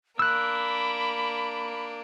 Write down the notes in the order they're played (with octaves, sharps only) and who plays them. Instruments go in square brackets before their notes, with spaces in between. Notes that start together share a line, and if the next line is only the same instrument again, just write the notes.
[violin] A#3 D4 [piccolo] B5 [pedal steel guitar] E6 F#6